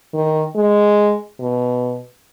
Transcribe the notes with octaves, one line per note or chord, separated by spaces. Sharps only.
D#3
G#3
B2